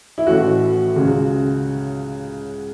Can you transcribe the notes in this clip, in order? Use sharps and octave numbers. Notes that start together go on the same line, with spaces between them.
E4
A1 A2 E3 A3 F#4
C#2 C#3 G#3